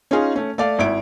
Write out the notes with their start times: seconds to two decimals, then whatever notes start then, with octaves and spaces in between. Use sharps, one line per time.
0.11 C#4 D#4 F4 G#4
0.36 A3 C#4
0.58 A3 D5 F5
0.79 G#1 E4 D7